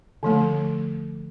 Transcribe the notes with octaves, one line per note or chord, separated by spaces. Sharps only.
D3 F3 A3